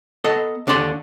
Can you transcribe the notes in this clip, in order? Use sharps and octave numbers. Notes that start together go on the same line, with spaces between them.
B3 A4 D#5
D#2 D3 G4 D5 C6